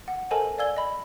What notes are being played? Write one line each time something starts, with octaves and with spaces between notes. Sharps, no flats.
F#5
A4 A#4 C5 D#5 G#5 A5
D5 F5 G#5 E6 G#6 G7
D#5 B5